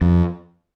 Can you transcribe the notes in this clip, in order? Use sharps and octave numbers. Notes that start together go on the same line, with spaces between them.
F2